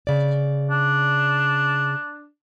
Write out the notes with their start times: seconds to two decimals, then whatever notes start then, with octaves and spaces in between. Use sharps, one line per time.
0.07 C#3 D5
0.70 D4